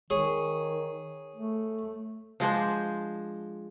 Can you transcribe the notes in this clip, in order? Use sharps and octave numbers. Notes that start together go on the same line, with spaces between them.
D#3 G#4 C#5
A3
F3 G#3 D4 C5